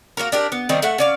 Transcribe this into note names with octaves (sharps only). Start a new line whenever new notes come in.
A#3 B3 F#4 A#4
D4 G4 A#4
B3
D#3 G3 A#3 C4
A3 E5 F#5
C#4 D5 F5